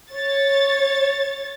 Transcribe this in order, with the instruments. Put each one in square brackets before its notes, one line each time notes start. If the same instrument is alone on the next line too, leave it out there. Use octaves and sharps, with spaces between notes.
[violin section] C#5 A6